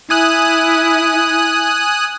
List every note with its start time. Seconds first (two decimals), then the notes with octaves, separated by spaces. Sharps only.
0.10 E4 G#5 D#6 F#6